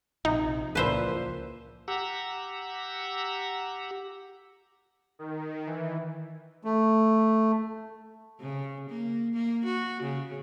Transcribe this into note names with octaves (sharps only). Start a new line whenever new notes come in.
A#1 C3 D#4
C#2 A#2 E3 F3 B4 C5 E5
G4 F#5 A#5 E6
D#3
E3
A3
C#3
A#3
A#3
F#4
C#3